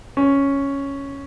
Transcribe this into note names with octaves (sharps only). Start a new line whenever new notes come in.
C#4